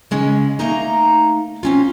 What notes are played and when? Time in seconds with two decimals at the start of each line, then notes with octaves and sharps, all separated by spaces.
0.11 C#3 G#3 C#4
0.59 A3 A#3 D#4 A#5
1.63 C4 C#4 F4